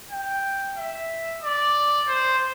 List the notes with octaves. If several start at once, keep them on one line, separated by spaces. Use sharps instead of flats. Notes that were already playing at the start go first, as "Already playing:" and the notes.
G5
E5
D5
C5